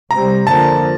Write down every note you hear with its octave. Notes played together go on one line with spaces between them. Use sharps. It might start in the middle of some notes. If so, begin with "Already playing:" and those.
C3 G3 C4 A#5
F2 D3 F3 A#3 A5